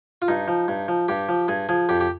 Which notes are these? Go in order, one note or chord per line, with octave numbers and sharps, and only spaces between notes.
F4
G2 D#4
F3
G2
F3
G2 G4
F3
G2 G#4
F3 G#4
F2 G4
G4